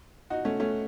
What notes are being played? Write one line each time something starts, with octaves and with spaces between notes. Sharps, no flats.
D#4 F#4
A3 C#4
A3 C#4